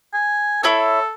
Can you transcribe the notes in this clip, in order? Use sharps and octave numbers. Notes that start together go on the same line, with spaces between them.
G#5
E4 A4 C#5 E6